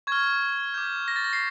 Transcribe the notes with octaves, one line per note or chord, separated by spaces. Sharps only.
C#6 F6 G#6
D6 G6
A#6
A6
A#6
C7